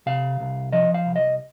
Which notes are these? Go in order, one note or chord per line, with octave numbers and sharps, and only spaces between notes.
C3 F5
C2
F3 D#5
F5
C2
D#5